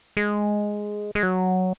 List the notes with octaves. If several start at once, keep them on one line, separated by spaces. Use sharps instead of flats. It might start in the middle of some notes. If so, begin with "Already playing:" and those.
G#3
G#3
F#3